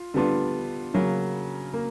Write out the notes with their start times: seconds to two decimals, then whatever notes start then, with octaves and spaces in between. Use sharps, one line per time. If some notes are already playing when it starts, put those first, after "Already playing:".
Already playing: F4
0.14 D3 G3 B3 D4 F4
0.94 C#3 F#3 A#3
1.74 A#3